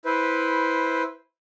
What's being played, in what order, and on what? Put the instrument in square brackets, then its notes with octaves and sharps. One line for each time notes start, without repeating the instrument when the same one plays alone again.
[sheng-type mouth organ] E4 B4 C5